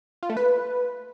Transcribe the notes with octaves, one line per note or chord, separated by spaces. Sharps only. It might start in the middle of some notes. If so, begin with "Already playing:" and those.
F4
A3
B4